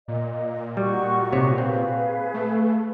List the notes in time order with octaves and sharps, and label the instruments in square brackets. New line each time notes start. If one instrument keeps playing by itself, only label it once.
[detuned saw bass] A#2 [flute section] D#5
[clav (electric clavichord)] G3 [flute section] D#4 F#4 C#6
[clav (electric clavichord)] C3 C#5
[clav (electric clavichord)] C4 [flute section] G#4 B4 F5
[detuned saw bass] A3